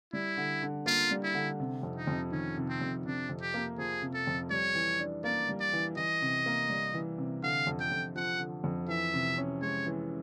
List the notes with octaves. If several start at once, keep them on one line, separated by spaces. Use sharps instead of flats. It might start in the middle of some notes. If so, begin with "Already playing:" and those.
G3 E4
D3
D3
A#3 F4
G3
E4
D3
C3
F2
D#4
F2
D#3 C#4
C3
C4
F2
C3 D4
F2
G4
A#3
F3 G#4
C3
A4
F2
G3 C#5
E3
D4
A#3 D5
G3
D5
E3
E3 D#5
C3
A#3
G3
E3
C3
D3 F5
F2
G5
F2
F3 F#5
D3
F2
E3 E5
C3
C#4
G#3 C#5
E3